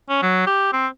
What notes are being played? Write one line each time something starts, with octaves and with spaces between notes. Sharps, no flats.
C#4
F#3
G4
C4